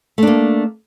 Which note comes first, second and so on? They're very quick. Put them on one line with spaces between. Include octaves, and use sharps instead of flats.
A3 D4 A#3